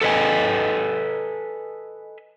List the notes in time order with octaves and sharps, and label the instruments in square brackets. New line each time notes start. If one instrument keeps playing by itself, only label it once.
[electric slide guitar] A4 B4 D#5 G#5